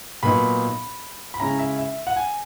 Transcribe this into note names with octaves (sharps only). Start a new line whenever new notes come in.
A#2 F#3 B3 D#4 B5
B5
C#3 G#3 C#4 E4 A#5
E5
E5
F#5
G#5